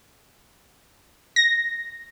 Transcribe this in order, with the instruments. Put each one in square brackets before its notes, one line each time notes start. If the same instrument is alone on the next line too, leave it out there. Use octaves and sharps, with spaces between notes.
[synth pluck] A#6